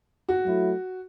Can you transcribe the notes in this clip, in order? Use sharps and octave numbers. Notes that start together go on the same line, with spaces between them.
F#4
F#3 A3 E4